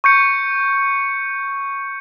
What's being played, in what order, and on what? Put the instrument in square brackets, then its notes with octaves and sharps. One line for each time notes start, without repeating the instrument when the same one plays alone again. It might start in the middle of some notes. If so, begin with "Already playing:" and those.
[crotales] C#6 G6 C#7